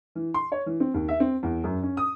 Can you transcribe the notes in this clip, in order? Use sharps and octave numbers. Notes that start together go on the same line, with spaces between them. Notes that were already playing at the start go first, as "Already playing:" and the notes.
E3
C6
C#5
E3
C4
D#2
E5
C4
E2
F#2
C#4
D#6